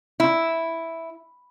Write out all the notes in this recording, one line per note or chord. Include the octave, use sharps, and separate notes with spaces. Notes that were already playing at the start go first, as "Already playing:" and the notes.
E4